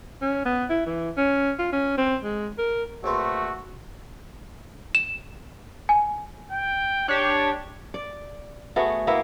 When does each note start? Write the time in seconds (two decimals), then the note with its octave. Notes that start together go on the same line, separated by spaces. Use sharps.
0.22 C#4
0.46 B3
0.70 E4
0.86 E3
1.17 C#4
1.59 F4
1.72 C#4
1.98 C4
2.24 G#3
2.58 A#4
3.04 A#1 A3 C4 F#4 B4
4.95 E7
5.89 G#5
6.51 G5
7.08 D4 G4 C#5
7.94 D5
8.76 A3 B3 F#4 G#4
9.07 A#3 B3 E4